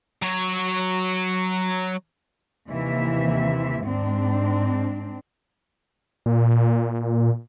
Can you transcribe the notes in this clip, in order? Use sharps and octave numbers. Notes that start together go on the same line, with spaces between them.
F#3 C#5
D#2 C3 E3 E5
G#2 C4 D4
A#2